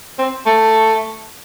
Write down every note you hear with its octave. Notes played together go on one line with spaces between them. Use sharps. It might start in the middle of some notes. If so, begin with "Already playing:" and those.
C4
A3